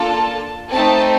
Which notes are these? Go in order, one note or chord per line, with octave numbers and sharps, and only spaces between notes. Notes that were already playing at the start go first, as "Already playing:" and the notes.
Already playing: A#3 D4 F4 A4 A5
A3 C4 D#4 A5